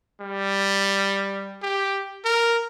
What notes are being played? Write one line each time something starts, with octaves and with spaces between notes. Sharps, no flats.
G3
G4
A#4